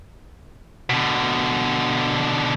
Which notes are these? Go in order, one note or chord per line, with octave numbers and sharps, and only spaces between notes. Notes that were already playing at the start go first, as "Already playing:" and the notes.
B2 D3